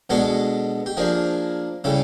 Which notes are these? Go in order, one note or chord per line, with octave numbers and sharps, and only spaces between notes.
B2 G#3 B3 D4 A4
G4
F3 A#3 D4 G#4
C#3 E3 G3 A4